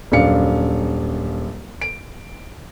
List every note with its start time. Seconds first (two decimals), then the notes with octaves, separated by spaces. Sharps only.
0.12 D#1 F#2 D4 F5 C#7
1.81 D7